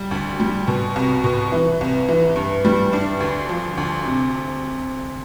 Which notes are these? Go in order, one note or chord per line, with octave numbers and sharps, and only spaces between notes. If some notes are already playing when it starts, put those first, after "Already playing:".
Already playing: G3
D2
G3
B2
C2
B2
E3
C2
E3
G2
G3
D4
D2
F3
D2
C3